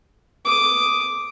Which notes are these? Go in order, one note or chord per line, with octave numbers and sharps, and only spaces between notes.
D6 D#6